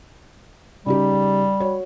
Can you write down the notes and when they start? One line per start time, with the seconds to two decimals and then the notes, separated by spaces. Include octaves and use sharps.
0.86 C#3 G3 D#4 G4
1.60 F#4 C#5